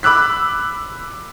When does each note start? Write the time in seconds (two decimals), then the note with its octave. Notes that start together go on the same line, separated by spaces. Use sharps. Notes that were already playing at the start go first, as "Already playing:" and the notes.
0.03 B5 D6 E6 F#6 B6